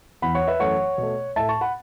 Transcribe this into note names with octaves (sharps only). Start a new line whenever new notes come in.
E2 E3 B3 F#5 B5
C#5 F#5
B4 E5
F#2 E3 A3 C#5 F#5
B2
A3
A2 A3 E5 A5
A5 C#6
F#5 B5